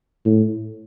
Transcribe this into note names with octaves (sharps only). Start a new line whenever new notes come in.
A2